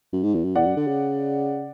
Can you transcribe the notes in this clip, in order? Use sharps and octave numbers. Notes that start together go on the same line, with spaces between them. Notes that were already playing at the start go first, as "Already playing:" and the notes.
F#2
G#2
E2
F#2
E2 D5 F#5
F#2
D3
C#3